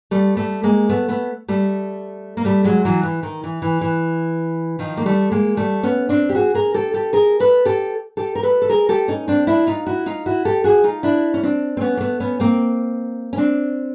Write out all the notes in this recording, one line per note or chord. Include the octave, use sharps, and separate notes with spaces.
G3 A3
G3 A3
G#3 A#3
A3 B3
A3 B3
G3 A3
A#3
G3 A3
F#3 G#3
E3 F#3
E3
D#3
E3
E3
E3
D#3 F3
A#3
G3 A3
G#3 A#3
G3 A3
B3 C#4
C4 D4
G4
F#4 G#4
G#4 A#4
G4 A4
G4 A4
G#4 A#4
A4 B4
G4 A4
G4 A4
A#4
A4 B4
A4
G#4 A#4
G4 A4
C#4 D#4
C4 D4
D4 E4
D#4 F4
E4 F#4
D#4 F4
E4 F#4
G4 A4
F#4 G#4
D#4 F4
D4 E4
C#4
C4 D4
C4
B3 C#4
A#3
A3 B3
B3 C#4
A#3 C4
C#4
C4 D4